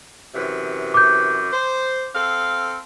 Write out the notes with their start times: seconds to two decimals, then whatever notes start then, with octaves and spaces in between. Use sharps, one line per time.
0.34 F#2 C3 E3
0.94 D6 G6
1.53 C5
2.14 C4 A4 F5